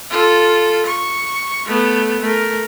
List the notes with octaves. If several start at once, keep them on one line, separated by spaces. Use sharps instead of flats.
F4 A4
C#6
A3 B3
A3 A#4